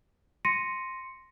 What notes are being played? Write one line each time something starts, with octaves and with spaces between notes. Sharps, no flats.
C6 A#6 C#7 D#7